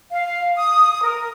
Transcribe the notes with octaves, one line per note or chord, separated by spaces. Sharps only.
F5
D#6
A#4